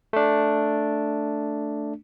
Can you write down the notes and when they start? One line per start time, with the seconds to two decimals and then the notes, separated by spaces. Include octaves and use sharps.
0.13 A3 D4